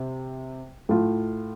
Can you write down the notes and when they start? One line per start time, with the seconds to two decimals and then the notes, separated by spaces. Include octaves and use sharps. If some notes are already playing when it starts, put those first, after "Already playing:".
Already playing: C3
0.89 A2 A3 F4